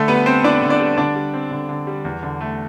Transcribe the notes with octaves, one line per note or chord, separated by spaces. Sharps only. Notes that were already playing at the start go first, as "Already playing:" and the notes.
Already playing: D3 A3 A4
G3 B3 B4
C4 C5
D3 D4 D5
D3
D4 D5
G3
D3 D4 D5
G3
C4
D3
D3
G3
E2
D3
A3